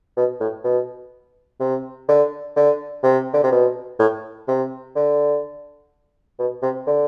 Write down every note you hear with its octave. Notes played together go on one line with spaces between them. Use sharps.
B2
A2
B2
C3
D3
D3
C3
D3
C3
B2
A2
C3
D3
B2
C3
D3